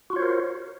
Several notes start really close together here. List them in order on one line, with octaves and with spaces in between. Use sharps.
F#4 F4 C#5 C5 A#4